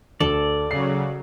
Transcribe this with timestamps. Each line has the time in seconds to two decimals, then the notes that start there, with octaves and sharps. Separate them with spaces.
0.20 D2 A4 D5
0.71 C#3 F#3 C7